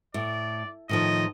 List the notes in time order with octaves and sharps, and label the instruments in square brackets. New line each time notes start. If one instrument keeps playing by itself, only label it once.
[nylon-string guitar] A2 [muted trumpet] D5
[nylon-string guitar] A2 D#3 F3 [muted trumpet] D#5